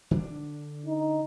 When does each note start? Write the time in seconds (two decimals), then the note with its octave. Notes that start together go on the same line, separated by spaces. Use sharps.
0.11 D3 D4
0.86 D#4